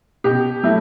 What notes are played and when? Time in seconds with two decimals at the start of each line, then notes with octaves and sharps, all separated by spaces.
0.24 B2 G4
0.63 F#3 A3 E4